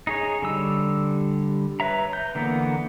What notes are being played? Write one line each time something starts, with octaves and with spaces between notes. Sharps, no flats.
D#4 G#4 C#5
D3 G3 E6
B4 C#5 E5 A#5
A#5 G6
D3 E3 A#3 B3